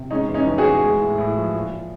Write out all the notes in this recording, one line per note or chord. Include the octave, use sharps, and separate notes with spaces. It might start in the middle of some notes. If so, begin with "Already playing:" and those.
Already playing: C3
G#3 C#4 D#4
E2
C#4 D#4
E2
F#4 G#4
E2
G#3
A2
A2
F3
A#2
A#2